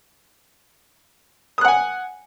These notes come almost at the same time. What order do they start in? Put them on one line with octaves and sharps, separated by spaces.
D#6 F#6 F#5 G#5